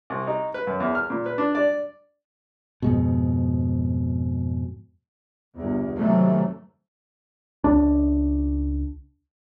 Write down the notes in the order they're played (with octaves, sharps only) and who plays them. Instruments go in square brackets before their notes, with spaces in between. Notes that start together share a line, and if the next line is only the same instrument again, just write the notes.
[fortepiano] C2
D#4
B4
F#2
E2
F6
A#2
B4
D4
D5
[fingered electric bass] F2 G#2 B2
[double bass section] G1 E2
C3 D#3 E3 F#3 A3
[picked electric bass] C#2 D4